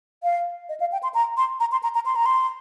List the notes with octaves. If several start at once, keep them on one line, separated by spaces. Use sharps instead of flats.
F5
D#5
F5
G5
C6
A#5
C6
A#5
C6
A#5
A#5
C6
A#5
C6